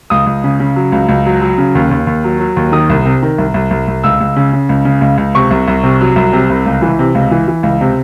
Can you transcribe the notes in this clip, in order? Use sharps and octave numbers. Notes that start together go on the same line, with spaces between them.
C#2 D#6
C#2
C#3
C#3
F#3
C#2
C#2
F#3
F#3
C#3
D#2
D#2
D#2
F#3
F#3
D#2
D#3 D#6
C2
C3
D#3
C2
C2
C2
C2
C#2 E6
C#2
C#3
C#3
C#2
C#3
C#2
C#2
C3 C#6
C2
C2
C3
F#3
C2
C3
C2
C#2
E3
C3
C#2
E3
E3
C#2
C3